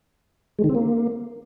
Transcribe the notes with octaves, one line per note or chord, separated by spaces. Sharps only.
G#3
D#3
C4
A#3